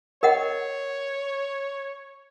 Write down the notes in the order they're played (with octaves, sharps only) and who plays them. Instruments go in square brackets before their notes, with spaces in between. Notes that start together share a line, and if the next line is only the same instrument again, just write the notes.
[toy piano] A#4 D#5 F#5 [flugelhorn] C#5